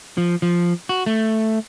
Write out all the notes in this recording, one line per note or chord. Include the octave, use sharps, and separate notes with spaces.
F3
F3
F#4
A3